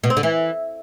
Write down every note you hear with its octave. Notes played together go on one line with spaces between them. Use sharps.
B2
C4
D3
E3